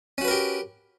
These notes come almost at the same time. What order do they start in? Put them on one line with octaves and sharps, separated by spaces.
C#4 F#4 B4 A#4 G4